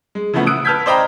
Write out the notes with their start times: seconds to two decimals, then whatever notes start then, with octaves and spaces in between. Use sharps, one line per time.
0.15 G#3
0.33 C#3 E3 F3 A3 B3
0.46 D#6 E6 F#6 D7
0.65 B4 A5 F6 G6 G#6 B6
0.86 C5 D5 D#5 G5 A#5 B5